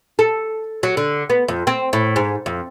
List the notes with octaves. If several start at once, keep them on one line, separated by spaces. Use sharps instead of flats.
A4
F#3
D3
B3
F2
C4
A2
G#2
F2